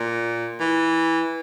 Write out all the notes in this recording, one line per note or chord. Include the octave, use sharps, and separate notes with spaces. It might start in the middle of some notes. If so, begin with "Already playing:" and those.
Already playing: A#2
E3